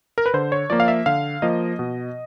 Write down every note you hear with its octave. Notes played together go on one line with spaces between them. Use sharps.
A#4
B4
D3 C5
C#5
F3 A#3 D5
F5
E5
D3 F5
F3 A#3 D#5
B2